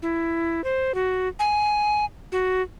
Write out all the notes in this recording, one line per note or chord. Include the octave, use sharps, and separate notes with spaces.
E4
C5
F#4
G#5
F#4